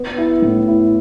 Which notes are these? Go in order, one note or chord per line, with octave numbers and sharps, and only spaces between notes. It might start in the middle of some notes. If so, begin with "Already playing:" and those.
Already playing: B3
E4
A2
E4